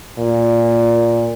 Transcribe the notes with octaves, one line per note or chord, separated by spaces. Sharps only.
A#2